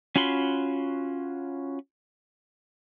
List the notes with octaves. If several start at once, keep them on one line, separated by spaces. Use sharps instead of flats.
C#4 F4 F#4 B5 C6